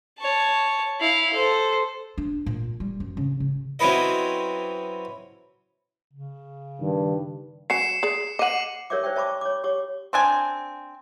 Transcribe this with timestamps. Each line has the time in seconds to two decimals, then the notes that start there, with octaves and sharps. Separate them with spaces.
0.19 C#5 A5
1.00 E4 F5
1.33 A4 C5
2.18 D4
2.46 A#2
2.80 G3
3.00 F#2
3.17 C#3
3.40 C#3
3.79 F#3 C4 C#4 E4 B4 D#5
6.13 C#3
6.81 G2 D#3
7.70 F#3 C#4 G#5 C7 C#7 E7
8.03 G#4 D5
8.39 D#5 F#5 D6 D#7 F#7
8.90 G4 A#4 C#5 D5 E5 D6
9.03 C5 D5 E5 G5 A5
9.15 D5 E5 A5 B5 C#6 D6
9.41 C#5 D6
9.64 G4 C#5 D6
10.13 C4 D4 G#5